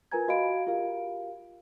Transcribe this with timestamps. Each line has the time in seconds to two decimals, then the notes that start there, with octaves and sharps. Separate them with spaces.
0.12 F4 A#4 B4 G#5 A#5 G#6
0.28 F#4 D#5 F5 B5 D7
0.67 F4 G4 A#4 F5